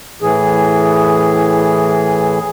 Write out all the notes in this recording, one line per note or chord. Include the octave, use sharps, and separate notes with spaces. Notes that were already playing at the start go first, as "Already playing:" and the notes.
A2 E3 G#4